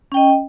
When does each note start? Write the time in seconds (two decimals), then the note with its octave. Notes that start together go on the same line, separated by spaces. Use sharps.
0.12 C#4
0.14 G5
0.17 D#5